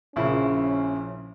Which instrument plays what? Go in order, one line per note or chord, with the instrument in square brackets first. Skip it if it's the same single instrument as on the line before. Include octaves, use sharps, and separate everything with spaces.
[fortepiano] A#1 C#3 E4 [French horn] C#4